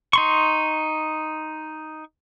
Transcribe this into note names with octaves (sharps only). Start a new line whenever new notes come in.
D#4 C6 C#6